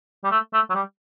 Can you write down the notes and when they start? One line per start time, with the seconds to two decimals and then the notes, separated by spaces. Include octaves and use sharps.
0.24 G3
0.31 A3
0.53 A3
0.69 F#3
0.75 G3